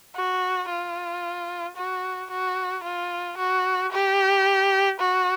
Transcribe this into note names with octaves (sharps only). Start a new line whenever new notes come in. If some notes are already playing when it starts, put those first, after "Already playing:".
F#4
F4
F#4
F#4
F4
F#4
G4
F#4